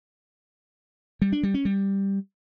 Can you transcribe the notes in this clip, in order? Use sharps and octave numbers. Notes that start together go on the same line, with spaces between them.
G3
D4
G3
C#4
G3